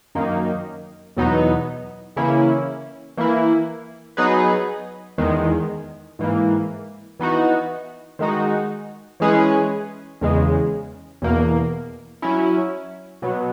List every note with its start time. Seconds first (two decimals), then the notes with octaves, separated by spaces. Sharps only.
0.15 F#2 D#3 A#3 D#4
1.17 E2 B2 F#3 B3 D#4
2.16 C#3 E3 A#3 C#4 E4
3.17 E3 A#3 E4
4.17 F#3 B3 D#4 G#4 B4
5.18 E2 D#3 G#3
6.19 G#2 E3 A#3
7.20 E3 B3 D#4 F#4
8.19 D#3 G#3 D#4 F#4
9.20 E3 G#3 C#4 G#4 B4
10.21 E2 C#3 G#3
11.22 E2 B2 A#3
12.22 F#3 C#4 E4
13.22 B2 F#3 B3